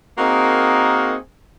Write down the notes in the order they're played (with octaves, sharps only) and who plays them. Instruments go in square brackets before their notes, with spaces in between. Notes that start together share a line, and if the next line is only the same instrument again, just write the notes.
[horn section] A#3 C4 D#4 F#4 G#4 A#4